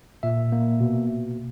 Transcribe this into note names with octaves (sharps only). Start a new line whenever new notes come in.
A#2 E5
A#3
B2